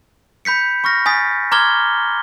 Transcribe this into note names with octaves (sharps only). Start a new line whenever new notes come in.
B5 G6 B6 C#7
B5 C#6 F6 A#6
G#5 D#6 A6 B6
A#5 C6 D6 F6 G#6 G7